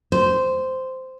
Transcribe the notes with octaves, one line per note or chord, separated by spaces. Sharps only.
C5